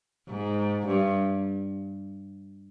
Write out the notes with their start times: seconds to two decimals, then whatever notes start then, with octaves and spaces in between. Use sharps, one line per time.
0.29 G#2
0.86 G2